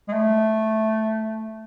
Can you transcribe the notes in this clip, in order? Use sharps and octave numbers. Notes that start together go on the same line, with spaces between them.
G#3
A3